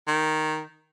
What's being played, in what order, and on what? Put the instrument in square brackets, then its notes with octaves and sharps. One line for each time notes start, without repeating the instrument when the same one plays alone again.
[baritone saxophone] D#3